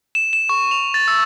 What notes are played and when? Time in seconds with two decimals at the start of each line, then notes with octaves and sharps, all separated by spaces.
0.15 E7
0.33 E7
0.49 C#6
0.71 F7
0.94 A6
1.08 E6